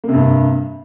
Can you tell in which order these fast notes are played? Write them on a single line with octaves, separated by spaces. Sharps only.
A#3 C3 G2